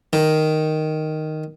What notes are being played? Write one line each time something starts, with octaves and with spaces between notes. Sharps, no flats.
D#3